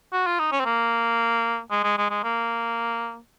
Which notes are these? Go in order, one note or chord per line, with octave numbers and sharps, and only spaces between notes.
F#4
F4
D#4
C#4
C4
A#3
G#3
G#3
G#3
G#3
A#3